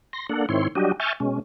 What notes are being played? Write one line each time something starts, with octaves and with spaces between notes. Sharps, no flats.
C6 A#6
A#3 D4 A4 F#5
G#2 D#3 C4 E4 C#5 C6
F#3 G3 D4 F#4 G4 D#5
E5 G#5 C#6 F6 G6 A6
B2 G#3 C#4